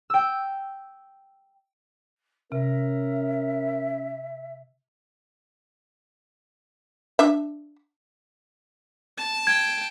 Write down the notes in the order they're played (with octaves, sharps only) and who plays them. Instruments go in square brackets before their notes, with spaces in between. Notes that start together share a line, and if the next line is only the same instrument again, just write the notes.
[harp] G5 E6
[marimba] C3 [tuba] C#4 [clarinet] A#4 [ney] E5
[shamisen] D4 E5
[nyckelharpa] A5
[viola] G5 [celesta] G#6